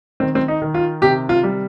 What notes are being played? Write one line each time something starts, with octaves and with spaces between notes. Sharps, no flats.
D#3 C4
C4
D#4
D#3
F4
C3 G4
F4
G3